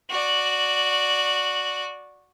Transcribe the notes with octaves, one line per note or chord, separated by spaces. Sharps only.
F#4 D5